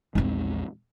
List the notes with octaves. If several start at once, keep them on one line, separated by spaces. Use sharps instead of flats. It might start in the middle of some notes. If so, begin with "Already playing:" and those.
A#1 E2 G#3 C4 D#4